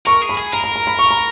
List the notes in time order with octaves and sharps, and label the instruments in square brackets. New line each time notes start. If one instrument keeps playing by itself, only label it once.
[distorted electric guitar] A#4 [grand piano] C#6
[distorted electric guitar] G#4
[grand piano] B5
[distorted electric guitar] G#4
[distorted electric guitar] A#4 [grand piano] A#5
[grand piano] A#5
A#5
B5
C#6
A#5